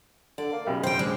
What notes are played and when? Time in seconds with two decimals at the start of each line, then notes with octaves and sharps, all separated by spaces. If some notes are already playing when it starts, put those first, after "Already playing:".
0.38 D3 D5
0.52 A#3
0.67 B1 C#3 G3
0.83 C4 C5 G5
0.99 G#3 D4